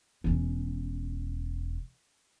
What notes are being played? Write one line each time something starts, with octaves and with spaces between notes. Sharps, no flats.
E1 C#4